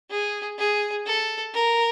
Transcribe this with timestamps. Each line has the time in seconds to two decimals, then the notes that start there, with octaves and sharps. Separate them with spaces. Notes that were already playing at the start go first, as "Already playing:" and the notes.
0.10 G#4
0.58 G#4
1.06 A4
1.54 A#4